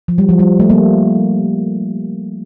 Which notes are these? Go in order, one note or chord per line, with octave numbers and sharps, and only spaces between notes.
F3
G3
F3
G3
A3
G3 A#3